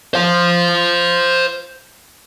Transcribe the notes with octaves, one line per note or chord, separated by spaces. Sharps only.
C5 F5